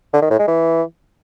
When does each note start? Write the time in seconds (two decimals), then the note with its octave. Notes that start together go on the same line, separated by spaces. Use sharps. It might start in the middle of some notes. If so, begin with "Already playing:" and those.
0.13 D3
0.22 D#3
0.31 A2
0.39 G#3
0.48 E3